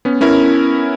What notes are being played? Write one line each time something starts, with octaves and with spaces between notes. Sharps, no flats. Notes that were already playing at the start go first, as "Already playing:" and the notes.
B3 C#4
B3 C#4 E4 A#4